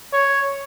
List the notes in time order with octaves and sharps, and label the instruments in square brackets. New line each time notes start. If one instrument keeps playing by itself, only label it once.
[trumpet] C#5